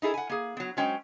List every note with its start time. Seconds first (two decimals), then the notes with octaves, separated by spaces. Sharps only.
0.02 D#4 E4 G#4 A4
0.14 F#5 G#5
0.30 A#3 G#4
0.57 F#3 B3
0.77 F#3 G#3 C#4 C5 G5